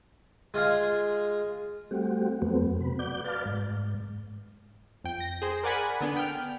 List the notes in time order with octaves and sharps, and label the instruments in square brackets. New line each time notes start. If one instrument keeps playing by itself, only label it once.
[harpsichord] G#3 F4 G#4 F5
[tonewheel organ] G3 A3 C4 F#4 G4
F2 F#3 A3 B3 C4
C3 B4
F#4 D5 G6
B4 D5 F5 A5
G#2
[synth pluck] F2 G5
A#6
G#4 C5
A#4 D5 F#5 G#5 B5
D3 B3 D4
G5 F6